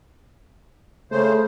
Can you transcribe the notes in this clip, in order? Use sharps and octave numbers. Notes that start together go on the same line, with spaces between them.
C#3 A3 C5